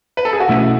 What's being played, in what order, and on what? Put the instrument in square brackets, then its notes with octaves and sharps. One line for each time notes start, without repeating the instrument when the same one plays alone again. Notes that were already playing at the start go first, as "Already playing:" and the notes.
[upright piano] B4
A4
G#4
F#4
[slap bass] B2 A3 C#4 [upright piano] E4